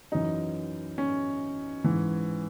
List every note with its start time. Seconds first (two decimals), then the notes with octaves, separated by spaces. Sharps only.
0.12 F#2 E3 D#4
0.98 C#4
1.84 G#2 E3